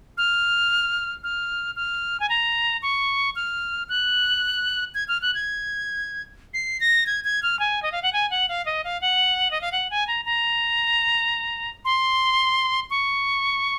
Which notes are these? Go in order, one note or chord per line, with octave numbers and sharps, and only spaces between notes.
F6
F6
F6
G#5
A#5
C#6
F6
F#6
G#6
F6
F#6
G#6
C7
A#6
G#6
G#6
F6
G#5
D#5
F5
F#5
G#5
F#5
F5
D#5
F5
F#5
D#5
F5
F#5
G#5
A#5
A#5
C6
C#6